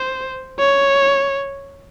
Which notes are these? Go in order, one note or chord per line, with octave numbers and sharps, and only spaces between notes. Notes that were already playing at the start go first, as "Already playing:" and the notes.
Already playing: C5
C#5